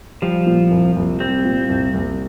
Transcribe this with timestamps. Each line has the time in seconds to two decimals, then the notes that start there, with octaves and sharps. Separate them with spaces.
0.22 F3 G3
0.47 A#2
0.71 C2
0.96 C2
1.20 G3 C4
1.45 A#2
1.69 C2
1.94 C2